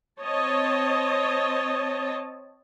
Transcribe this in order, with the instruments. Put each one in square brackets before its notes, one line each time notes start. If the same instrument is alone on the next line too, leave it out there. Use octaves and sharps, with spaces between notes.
[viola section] C4 C#5 D#5 A5